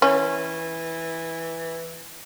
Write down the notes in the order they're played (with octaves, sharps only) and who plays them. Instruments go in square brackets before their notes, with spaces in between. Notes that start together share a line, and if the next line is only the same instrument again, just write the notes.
[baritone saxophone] E3 [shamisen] C#4